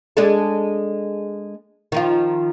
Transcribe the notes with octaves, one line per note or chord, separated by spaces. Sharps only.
G#3 D4 A4
D#3 F3 F4